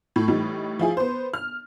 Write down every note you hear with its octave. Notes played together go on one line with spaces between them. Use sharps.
A2
A2 E3 G3 D#4
F3 E4 G#4
B3 C5
F6